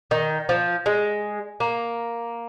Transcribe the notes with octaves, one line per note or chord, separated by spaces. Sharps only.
D#3
F3
G#3
A#3